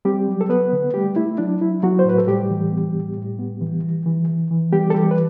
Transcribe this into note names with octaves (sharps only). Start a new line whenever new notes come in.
G3 C4 G4
F#3
A4
F#3 B3 B4
D3
G3 A3 G4
A3 E4
F#3 D4
F#3 E4
F#3 B3 F#4
C5
A2 B4
A4
A2 G3 G4
E3
B3
A2
A2
B3
E3
E3
E3
E3
E3
G3 B3 G4
A4
E3 G3 G4
B4